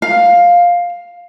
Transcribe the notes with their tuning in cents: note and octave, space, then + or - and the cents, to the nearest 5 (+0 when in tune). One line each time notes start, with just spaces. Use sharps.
F5 +10